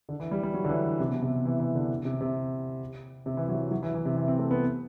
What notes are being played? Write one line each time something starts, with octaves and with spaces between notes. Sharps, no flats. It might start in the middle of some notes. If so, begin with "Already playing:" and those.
D3
E3
G3
G3
F#3
D3
E3
C3
B2
C3
E3
E3
D3
C3
C3
C3
E3
F#3
F#3
E3
E3
C3
E3
C4
A3
B3